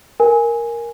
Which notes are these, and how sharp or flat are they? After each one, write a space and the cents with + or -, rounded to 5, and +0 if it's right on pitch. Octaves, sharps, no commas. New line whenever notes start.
A#4 +0 G#5 +0